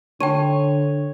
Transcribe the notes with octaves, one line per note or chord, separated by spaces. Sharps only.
D3 C#5 G5 A5 D#7